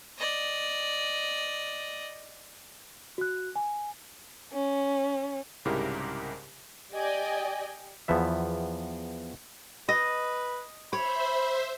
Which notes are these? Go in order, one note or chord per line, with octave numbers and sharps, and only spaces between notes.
D5 D#5
F#4 F#6
G#5
C#4
C2 G#2 C#3 E4 G4 A#4
G4 D5 D#5 G5 G#5
E2 F3 B3 E5
B4 D#5
C5 C#5 E5 B5